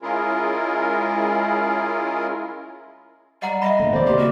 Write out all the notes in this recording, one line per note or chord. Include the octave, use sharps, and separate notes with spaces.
G#3 C#4 E4 F4 G#4 A#4
G3 D#5 F#5 A#5
D#5 E5 B5
A#2 D3 A3
C2 E3 B3 C4 D5
C#3 A#3 G4 D5 C6
F#4 B4